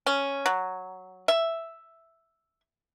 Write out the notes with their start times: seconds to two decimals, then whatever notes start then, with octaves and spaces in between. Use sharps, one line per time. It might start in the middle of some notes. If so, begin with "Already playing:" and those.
0.06 C#4
0.46 F#3
1.28 E5